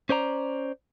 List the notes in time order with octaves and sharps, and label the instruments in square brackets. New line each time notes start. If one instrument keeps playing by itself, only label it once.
[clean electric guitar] C#4 C5 D5 A#5